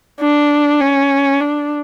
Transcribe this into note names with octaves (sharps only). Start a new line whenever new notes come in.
D4
C#4
D4